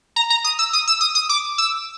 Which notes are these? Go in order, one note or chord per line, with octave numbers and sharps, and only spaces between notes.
A#5
A#5
D#6
E6
D#6
E6
D#6
D#6
D6
E6